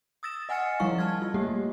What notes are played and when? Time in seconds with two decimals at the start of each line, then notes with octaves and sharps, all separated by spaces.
0.23 D#6 E6 A6 A#6 E7
0.49 D#5 F#5 G#5 F6 A6 C#7
0.80 D#3 F3 G3 E4 F5 C#6
0.98 A5 F6 G#6
1.22 F4
1.34 G3 A3 A#3 G4